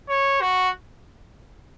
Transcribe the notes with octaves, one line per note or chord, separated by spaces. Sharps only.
C#5
F#4